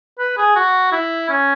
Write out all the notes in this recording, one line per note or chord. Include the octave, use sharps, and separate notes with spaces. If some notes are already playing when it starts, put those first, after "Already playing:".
B4
G#4
F#4
E4
C#4